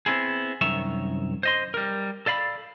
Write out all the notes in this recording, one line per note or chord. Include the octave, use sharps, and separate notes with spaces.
B3 C4 E4 G#4
C2 F#2 D#3 C#5 E5
C5 D#5 C6
G3 A#4
A4 D5 F5 B5